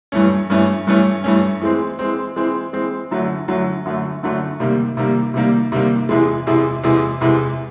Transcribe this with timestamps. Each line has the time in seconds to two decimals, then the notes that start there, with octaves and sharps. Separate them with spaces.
0.12 G2 E3 A3 C#4
0.50 G2 E3 A3 C#4
0.87 G2 E3 A3 C#4
1.24 G2 E3 A3 C#4
1.62 E3 G#3 C4
1.99 E3 G#3 C4
2.36 E3 G#3 C4
2.73 E3 G#3 C4
3.11 F#2 D3 F#3 A3
3.48 F#2 D3 F#3 A3
3.85 F#2 D3 F#3 A3
4.23 F#2 D3 F#3 A3
4.60 C3 D#3 G3 A#3
4.97 C3 D#3 G3 A#3
5.34 C3 D#3 G3 A#3
5.72 C3 D#3 G3 A#3
6.09 E2 C3 E3 G#3
6.47 E2 C3 E3 G#3
6.84 E2 C3 E3 G#3
7.21 E2 C3 E3 G#3